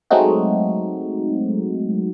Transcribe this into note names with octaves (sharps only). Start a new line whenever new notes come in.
F#3 G#3 A3 C4 D#4 F#4